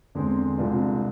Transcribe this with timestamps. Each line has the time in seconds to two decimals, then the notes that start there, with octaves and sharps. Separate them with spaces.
0.15 E2 D3 G#3 C4
0.58 C2 C3 G#3 D4 F4